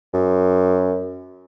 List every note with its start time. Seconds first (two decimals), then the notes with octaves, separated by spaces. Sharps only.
0.14 F#2